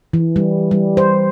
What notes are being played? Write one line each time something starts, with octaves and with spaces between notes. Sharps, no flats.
E3
G3
G3
C5